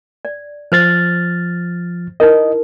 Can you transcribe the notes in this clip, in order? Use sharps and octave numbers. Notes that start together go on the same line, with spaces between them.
D5
F3 C5 F6 A6
D#4 E4 A#4 D#5